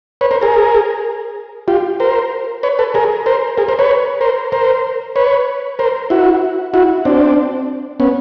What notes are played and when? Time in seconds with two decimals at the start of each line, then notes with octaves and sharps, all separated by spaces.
0.21 B4 C#5
0.31 A#4 C5
0.41 G#4 A#4
1.68 F4 G4
2.00 A#4 C5
2.63 B4 C#5
2.79 A4 B4
2.94 G#4 A#4
3.26 A#4 C5
3.58 G#4 A#4
3.68 A#4 C5
3.79 B4 C#5
4.21 A#4 C5
4.52 A#4 C5
5.16 B4 C#5
5.79 A#4 C5
6.10 E4 F#4
6.74 E4 F#4
7.05 C4 D4
8.00 B3 C#4